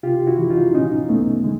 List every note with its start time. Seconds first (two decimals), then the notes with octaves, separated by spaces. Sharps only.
0.03 C3 F4 G4
0.27 E4 F#4
0.39 E3
0.50 D#4 F4
0.74 A#2 C#4 D#4
1.09 C2 A3 B3
1.44 D3 G#3